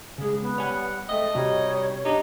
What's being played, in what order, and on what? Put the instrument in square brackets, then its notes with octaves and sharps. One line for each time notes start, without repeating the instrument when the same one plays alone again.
[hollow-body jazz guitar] C#3 G#3 [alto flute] G#4
[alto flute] B3
[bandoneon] G3 F#5 [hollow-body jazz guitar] C#5 G#5
[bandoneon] G#3 C4 E5 [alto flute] A3 [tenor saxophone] D#5
[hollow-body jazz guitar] C3 F#4 [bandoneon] G3 D#4 [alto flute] C#5
[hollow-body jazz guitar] D4 G4 [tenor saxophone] D#4